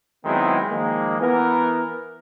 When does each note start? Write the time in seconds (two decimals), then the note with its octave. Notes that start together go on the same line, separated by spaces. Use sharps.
0.25 D#3 F#3 G#3 B3 C4 E4
0.69 D#3 F3 G#3 A#3
1.20 E3 B3 A#4